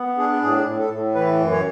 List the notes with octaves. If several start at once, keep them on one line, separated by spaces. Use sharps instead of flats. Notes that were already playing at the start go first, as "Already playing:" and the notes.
Already playing: B3
D4 G#4
A2 G#4
A2
A4
A2
E3 B4
F#2
C#5